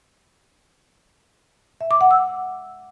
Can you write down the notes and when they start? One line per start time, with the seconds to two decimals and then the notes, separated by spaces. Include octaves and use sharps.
1.81 E5
1.91 D6
2.01 F#5
2.11 E6